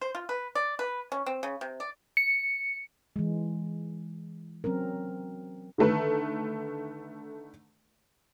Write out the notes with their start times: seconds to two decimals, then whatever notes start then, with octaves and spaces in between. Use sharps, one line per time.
0.01 C5
0.15 F4
0.29 B4
0.55 D5
0.79 B4
1.12 C#4
1.26 C4
1.43 C#3
1.61 C3
1.80 D5
2.17 C#7
3.16 E3 G#3
4.64 F#3 C4 C#4 A#4
5.78 D3 D#3 A3 B4